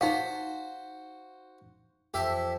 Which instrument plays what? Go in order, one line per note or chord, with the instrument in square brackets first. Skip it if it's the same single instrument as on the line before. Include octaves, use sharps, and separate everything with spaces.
[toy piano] D#4 F5 [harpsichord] F#4 C5
[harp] F2 [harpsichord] G4 E5